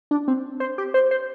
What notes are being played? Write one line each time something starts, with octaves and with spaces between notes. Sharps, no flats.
D4
C4
C5
G4
C5
C5